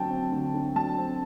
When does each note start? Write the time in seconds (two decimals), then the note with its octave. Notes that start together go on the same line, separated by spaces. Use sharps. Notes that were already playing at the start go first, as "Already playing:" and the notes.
Already playing: D2 D3 F#3 C4 G5 A5
0.10 C4
0.32 D2
0.54 D3
0.76 F#3 A5
0.98 C4